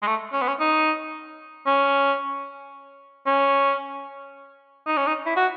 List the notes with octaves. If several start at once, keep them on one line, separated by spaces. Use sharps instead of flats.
G#3
A3
C#4
B3
C#4
D#4
C#4
C#4
D#4
C#4
D#4
E4
F#4